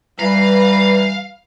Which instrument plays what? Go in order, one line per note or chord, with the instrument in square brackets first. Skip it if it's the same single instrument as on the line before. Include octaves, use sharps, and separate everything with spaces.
[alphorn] E3 [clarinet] G3 [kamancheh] B4 A#5 [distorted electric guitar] F5